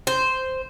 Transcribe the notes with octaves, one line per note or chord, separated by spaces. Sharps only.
C5